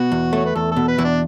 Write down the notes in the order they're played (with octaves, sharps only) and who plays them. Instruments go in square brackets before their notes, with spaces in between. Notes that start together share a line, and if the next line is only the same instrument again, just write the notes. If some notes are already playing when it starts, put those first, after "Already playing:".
Already playing: [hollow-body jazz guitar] B2 [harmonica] F#4
[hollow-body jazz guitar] E2
[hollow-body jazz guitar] A3 [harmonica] C#5
[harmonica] B4
[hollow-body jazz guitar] E2 [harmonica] A4
[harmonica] A4
[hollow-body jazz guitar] B2
[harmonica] B4
[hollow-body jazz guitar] E2 [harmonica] E4
[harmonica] D4